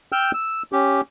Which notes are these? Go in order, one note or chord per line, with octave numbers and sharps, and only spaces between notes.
G5 E6 F6 G6
E6
C#4 G4